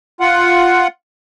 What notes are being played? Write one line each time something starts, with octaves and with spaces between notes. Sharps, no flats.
F4 F#5